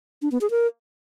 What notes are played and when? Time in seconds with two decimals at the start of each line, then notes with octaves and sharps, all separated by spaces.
0.22 D4
0.32 B3
0.41 G#4
0.51 A#4